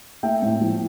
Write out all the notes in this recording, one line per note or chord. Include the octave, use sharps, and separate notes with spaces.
A3 E5 G5
A2
F3